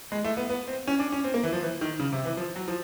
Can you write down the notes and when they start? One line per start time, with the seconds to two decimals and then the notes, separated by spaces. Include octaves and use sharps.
0.12 G#3
0.24 A3
0.37 B3
0.50 B3
0.68 C4
0.88 C#4
0.99 D4
1.12 C#4
1.24 C4
1.34 A#3
1.43 E3
1.53 F3
1.62 E3
1.81 D#3
1.99 C#3
2.12 C3
2.25 E3
2.37 F3
2.56 F#3
2.68 F3